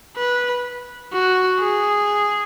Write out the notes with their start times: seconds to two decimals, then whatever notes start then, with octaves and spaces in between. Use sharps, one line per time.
0.17 B4
1.13 F#4
1.59 G#4